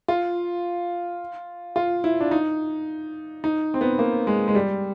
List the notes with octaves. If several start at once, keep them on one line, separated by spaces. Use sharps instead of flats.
F4
F4
E4
D4
D#4
D#4
C4
B3
A#3
G#3
G#3
G3